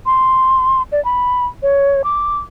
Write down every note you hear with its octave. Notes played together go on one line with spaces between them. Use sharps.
C6
D5
B5
C#5
D6